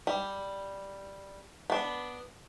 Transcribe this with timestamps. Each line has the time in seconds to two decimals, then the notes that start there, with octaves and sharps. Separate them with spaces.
0.07 G3
1.70 B3 D4